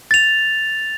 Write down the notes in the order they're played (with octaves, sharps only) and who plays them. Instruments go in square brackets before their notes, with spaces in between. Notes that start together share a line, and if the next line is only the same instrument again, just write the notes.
[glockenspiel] A6 F7